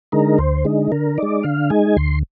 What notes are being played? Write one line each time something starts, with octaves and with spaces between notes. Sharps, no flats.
D3 G#3 D#4 A#4
D2 C5
D3 G#3 D#4
D3 A#4
G#3 D#4 D5
D3 F5
G#3 D#4 G#5
D2 C6